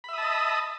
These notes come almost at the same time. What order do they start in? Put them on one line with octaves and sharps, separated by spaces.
B5 E5 D#6 A5 D#5